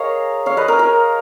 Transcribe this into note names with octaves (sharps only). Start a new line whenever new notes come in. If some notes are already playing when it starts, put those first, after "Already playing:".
Already playing: G#4 A#4 C#5 D#5 F5
C#5 F5
B4 D#5
A#4 C#5
A#4 C#5